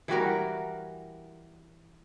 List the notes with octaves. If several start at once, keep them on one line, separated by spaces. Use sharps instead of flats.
E3 G3 F#4 A#4